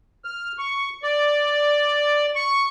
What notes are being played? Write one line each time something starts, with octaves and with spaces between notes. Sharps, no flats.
F6
C#6
D5
C#6